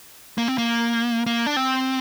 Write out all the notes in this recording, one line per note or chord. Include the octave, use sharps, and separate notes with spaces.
A#3
C4
A#3
A#3
D4
C4